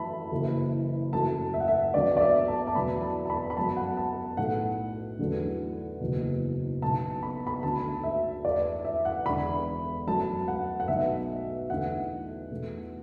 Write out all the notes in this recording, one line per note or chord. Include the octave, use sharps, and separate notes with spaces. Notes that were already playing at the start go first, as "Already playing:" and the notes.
Already playing: F#2 E3 A3 E5 A5 B5
F#1 F#2 E3
F#2 F#3 A3 A5
E5
F#5
E5
D2 D3 F#3 B3 D5
D5
E5
A5
A5
E2 B2 F#3 B3 B5
A5
A5
B5
B5
F#2 F#3 B3 A5
F#5
A5
B1 A2 A3 F#5
E2 D3 F#3 A3
F#1 E2 B2
B1 B2 B3 A5
B5
B5
D2 D3 A3 A5
E5
E2 E3 A3 D5
E5
F#5
E1 E2 D3 B3 B5
F#2 F#3 A3 A5
F#5
F#5
B1 B2 A3 E5
E2 D3 A3 F#5
E2 B2 A3